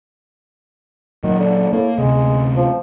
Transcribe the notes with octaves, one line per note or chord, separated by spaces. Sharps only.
A#2 D#3 F#3
D3
A2 A#3
D2 C3 G#3
F3